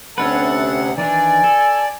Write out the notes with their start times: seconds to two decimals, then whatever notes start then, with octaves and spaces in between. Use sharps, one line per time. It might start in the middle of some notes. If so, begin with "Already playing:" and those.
0.18 D2 C3 C#4 D4 A4 B4 F#5
0.98 D#3 E3 D4 D5 G#5
1.44 A4